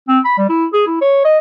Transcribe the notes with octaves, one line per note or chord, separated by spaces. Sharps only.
C4
B5
G3
E4
G#4
E4
C#5
D#5